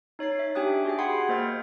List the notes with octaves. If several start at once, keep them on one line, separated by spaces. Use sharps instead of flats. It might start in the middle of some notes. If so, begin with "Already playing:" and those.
D#4 C#5 A6 C7
E5
D4 G4 G5 G#5 D#6 F#6
F#4 G#4 G5
F#5 B5 C6 D#6 G#6 C7
A#3 C5 D#5 F6 A6